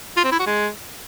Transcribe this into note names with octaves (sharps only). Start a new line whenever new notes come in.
F4
C4
E4
F#4
G#3